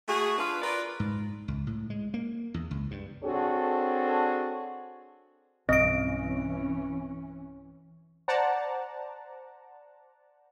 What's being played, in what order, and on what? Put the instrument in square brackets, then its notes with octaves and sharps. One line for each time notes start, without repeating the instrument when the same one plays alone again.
[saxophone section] A3 F#4 G#4
D4 F4 B4
F4 A#4 B4 D5
[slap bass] G#2
C#2
A2
G#3
A#3
E2
C#2
G2
[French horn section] C4 D4 F#4 G#4 A4 C#5
[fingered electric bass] B1 G2 [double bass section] E3 C#4 [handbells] C4 D7 [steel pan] D#5
[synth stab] C5 D5 F#5 A5 A#5